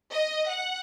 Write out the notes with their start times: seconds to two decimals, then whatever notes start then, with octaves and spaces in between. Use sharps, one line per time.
0.14 D#5
0.51 F#5